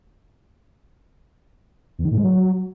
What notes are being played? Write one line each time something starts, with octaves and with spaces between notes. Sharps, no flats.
E2
D#3
A2
G#3
F#3